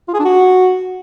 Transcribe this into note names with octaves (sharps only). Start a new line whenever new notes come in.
F4
G#4
D4
F#4